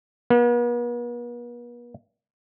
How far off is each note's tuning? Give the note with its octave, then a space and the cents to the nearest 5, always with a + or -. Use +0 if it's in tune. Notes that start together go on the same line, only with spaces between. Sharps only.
B3 -45